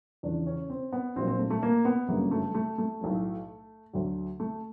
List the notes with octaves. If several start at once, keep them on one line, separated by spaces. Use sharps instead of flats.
E2 C#3 F3 D4
C#4
C4
B3
A#1 A#2 F#3 C4
C4
A3
A3
A#3
B3
G1 F#2 C#3 F#3 A#3
A3
A3
A3
B1 A2 F#3
D2 D3 F#3
A3